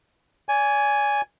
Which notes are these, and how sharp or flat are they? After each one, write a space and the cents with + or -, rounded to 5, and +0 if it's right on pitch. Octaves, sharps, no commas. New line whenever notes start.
D5 -40 G#5 +0